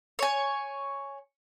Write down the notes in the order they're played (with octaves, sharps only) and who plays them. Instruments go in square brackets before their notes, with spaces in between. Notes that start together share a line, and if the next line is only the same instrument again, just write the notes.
[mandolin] C#5 G#5